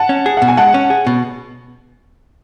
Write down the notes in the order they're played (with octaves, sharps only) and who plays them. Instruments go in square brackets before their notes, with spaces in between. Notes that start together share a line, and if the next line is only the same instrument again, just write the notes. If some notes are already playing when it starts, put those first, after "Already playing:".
Already playing: [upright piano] F#5 A5
[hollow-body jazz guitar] C#4
G#4
[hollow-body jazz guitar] B2 [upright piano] F#5
[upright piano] G#5
[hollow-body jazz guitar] G#3 [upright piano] F#5 A5
[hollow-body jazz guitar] C#4
G#4
B2